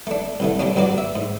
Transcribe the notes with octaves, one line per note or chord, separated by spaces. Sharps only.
A3 D4
C2 D3 A3
G3 A#3 C#4 D4
G2 F#3 A#3 F#4 D5
E5
G#2